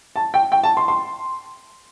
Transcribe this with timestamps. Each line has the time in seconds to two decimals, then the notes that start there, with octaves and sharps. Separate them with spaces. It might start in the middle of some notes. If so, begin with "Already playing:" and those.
0.16 A5
0.34 G5
0.52 G5
0.63 A5
0.77 C6
0.88 C6